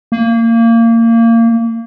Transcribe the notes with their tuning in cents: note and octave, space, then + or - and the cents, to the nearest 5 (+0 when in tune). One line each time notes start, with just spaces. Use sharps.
A#3 -25